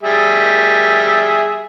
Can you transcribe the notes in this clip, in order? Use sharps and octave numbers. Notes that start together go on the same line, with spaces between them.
G3 G#4 E5